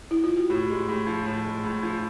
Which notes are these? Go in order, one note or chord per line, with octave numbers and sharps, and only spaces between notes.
E4
F4
F#4
A2 G4
G#3
A2
F3
A2
G#3
A2
F3